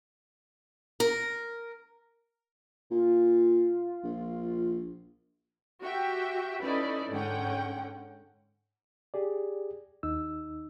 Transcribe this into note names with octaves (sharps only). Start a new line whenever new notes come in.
A#4
A#2 F4
A#1
F#4 G4 E5 G5
C#4 D#4 E4 A4 B4 D5
G#2 D3 C#4 F#5 G5
G4 G#4 D5
D#2 D#4 E6